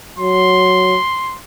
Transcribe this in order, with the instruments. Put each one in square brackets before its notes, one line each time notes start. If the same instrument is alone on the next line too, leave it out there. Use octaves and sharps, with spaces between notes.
[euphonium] F#3 [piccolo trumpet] C6